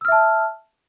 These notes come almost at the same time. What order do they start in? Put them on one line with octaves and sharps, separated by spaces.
E6 F6 E5 A5